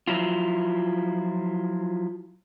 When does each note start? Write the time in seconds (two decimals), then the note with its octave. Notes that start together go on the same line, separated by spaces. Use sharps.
0.08 F3 F#3 E4 F4